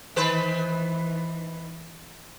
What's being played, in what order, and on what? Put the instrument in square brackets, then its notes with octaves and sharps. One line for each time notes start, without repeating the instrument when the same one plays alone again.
[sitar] D#3 B4 C5 [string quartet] E3